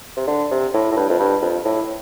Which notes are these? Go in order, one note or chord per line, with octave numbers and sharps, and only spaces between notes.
C3
D3
C3
A2
A2
G2
F2
G2
F2
A2